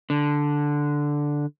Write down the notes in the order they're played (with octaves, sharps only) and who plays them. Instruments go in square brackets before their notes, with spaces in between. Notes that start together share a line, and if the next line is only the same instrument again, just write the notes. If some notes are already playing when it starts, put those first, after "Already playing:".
[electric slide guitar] D3